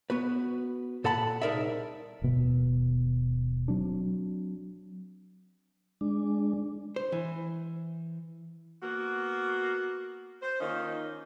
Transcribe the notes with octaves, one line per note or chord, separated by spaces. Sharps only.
B3 F#4 B4
A#2 A4 F#5 A5 B5
C2 D#4 G#4 A#4 D5 E5
D#1 B2
F#3 C4 D4
G#3 D4
C5
E3
A#3 B3 F#4
C5
D#3 A#3 C#4 D#4 F4